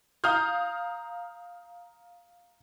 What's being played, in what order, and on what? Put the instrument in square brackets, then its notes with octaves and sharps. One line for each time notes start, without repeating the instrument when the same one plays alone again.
[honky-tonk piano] F5 A#5 D#6 F6 G6